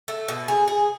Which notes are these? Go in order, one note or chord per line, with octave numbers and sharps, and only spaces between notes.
A3
B2
G#4
G#4